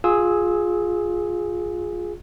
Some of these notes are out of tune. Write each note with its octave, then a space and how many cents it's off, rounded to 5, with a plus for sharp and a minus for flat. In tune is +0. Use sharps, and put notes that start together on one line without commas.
F4 +20 G#4 +0 E6 -20